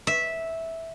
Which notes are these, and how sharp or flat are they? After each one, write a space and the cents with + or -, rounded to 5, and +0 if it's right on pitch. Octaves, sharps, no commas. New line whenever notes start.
E5 -10